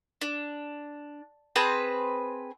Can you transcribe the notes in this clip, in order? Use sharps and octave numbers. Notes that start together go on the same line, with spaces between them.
D4
C4 G#4 B4 A5